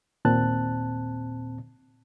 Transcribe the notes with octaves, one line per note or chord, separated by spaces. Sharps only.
D#2 A#2 C4 A5 F#6